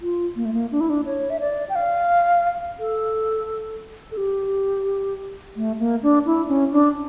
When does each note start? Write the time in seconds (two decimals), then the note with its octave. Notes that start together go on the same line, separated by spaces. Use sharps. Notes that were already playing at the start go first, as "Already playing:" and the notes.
0.01 F4
0.36 A#3
0.45 A3
0.54 A#3
0.72 D4
0.81 E4
0.90 D4
1.06 C#5
1.30 E5
1.40 D5
1.69 G5
1.75 F5
2.79 A4
4.11 A4
4.17 G4
5.56 A3
5.79 A#3
6.03 D4
6.26 E4
6.48 C#4
6.72 D4